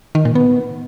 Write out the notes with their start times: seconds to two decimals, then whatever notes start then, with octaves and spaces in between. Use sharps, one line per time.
0.15 D#3
0.25 A#2
0.35 B3